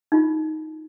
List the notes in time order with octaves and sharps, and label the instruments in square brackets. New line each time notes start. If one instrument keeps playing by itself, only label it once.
[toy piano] D#4 F4